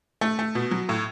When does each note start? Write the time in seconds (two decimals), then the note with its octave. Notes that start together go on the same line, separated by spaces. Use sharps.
0.21 A3
0.39 A3
0.55 B2
0.71 F#3
0.89 A2